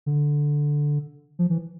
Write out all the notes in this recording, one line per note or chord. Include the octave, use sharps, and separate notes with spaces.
D3
F3
E3